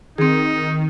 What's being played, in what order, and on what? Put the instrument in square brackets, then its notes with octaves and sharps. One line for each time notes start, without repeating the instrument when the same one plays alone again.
[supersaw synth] D#3 [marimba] C4 G#4 [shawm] D#4